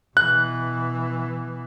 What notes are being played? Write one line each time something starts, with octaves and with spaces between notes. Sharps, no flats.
B2 E3 F#6